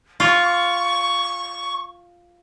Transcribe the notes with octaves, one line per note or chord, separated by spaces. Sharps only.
F4 C#6